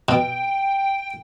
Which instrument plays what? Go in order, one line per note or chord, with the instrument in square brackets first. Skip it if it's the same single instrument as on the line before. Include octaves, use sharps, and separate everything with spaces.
[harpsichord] B2 [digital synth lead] G5